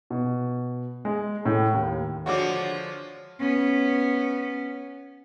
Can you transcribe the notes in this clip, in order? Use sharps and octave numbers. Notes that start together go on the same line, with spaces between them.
B2
G#3
A2
D#2
D3 F3 G#3 F#4 C#5 D6
B3 C#4